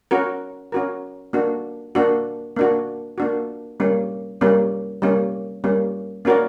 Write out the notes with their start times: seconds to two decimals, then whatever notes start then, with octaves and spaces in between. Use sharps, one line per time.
0.11 C#4 F#4 A#4
0.72 C#4 F#4 A#4
1.33 A#3 D4 F#4
1.95 A#3 D4 F#4
2.56 A#3 D4 F#4
3.18 A#3 D4 F#4
3.80 G3 A#3 C#4
4.41 G3 A#3 C#4
5.02 G3 A#3 C#4
5.64 G3 A#3 C#4
6.25 A#3 C#4 F#4 A#4 D5